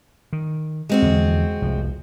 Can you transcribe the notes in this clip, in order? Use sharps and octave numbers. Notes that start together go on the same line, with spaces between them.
D#3
G#3 C4 F#4
E2 D3 F3
F1 C2 F3